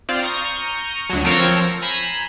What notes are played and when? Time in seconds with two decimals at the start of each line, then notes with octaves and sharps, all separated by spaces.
0.09 C4 F4 C5 D5 F5
0.22 A#5 C#6 D#6 F6 G6
1.10 D2 F#3
1.24 F3 C4 A4 A#4 C#5
1.82 G#5 A#5 B5 G6 C7 E7